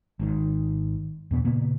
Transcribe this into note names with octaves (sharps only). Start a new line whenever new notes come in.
G#1 G#2 D#3
E2 B2 B3
A#2 C#3 A#3 B3